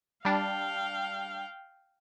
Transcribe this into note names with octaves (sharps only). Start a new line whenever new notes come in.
G3 D4 F5 G5